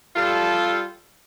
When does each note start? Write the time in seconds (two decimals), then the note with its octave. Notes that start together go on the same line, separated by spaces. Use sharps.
0.16 G3 F4 A4